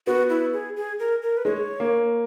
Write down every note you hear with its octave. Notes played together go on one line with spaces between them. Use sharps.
B3 F#4
E4
G#4
G#4
A#4
A#4
B4
G#3 C#5
A#3